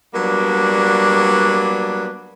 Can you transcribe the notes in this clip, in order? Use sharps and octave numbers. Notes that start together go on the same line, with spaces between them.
F#3 G3 A#3 B3 D4